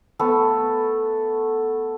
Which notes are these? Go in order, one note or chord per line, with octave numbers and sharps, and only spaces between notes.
A3 B3 A4